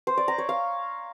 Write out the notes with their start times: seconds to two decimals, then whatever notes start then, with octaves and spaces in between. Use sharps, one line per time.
0.07 C5
0.17 D5
0.28 A#5
0.38 C#5
0.49 F5